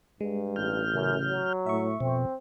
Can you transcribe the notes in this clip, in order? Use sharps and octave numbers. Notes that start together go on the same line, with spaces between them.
G2 G#3
A1 F6 G6
F#2 C#3
F#3
A2 E5 C#6
F2 B2 C4